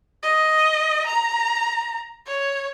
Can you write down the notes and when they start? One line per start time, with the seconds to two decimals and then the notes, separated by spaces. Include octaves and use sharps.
0.23 D#5
1.06 A#5
2.27 C#5